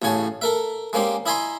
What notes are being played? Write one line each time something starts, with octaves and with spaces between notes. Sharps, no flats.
A1 A2 C#3 C#5 G#5 A5
A4 A#4 E5
G#3 A#3 C4 C#4 G4
E4 D#5 E5 G#5 A#5 C6